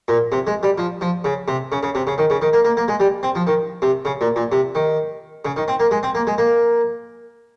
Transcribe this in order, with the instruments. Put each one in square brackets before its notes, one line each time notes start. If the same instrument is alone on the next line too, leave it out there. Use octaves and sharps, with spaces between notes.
[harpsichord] A#2
C3
G#3
G3
F3
F3
C#3
C3
C#3
C#3
C3
C#3
D#3
C#3
D#3
A#3
A#3
A#3
G#3
G3
C4
F3
D#3
C3
C#3
A#2
A#2
C3
D#3
C#3
D#3
C4
A#3
G#3
C4
A#3
G#3
A#3